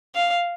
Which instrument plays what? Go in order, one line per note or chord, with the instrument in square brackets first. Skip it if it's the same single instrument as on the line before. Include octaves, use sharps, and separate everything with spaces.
[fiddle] F5